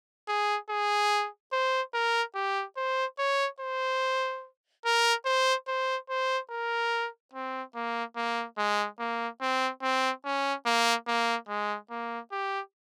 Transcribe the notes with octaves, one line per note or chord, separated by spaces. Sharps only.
G#4
G#4
C5
A#4
G4
C5
C#5
C5
A#4
C5
C5
C5
A#4
C4
A#3
A#3
G#3
A#3
C4
C4
C#4
A#3
A#3
G#3
A#3
G4